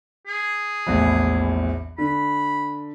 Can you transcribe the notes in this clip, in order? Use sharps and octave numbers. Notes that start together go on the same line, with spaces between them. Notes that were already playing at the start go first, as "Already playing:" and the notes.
G#4
A#1 E2 A2
D3 B5